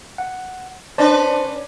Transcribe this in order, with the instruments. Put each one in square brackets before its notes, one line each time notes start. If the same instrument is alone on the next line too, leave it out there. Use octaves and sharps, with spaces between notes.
[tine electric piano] F#5
[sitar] C#4 D4 B4 [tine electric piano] C5 D5 A5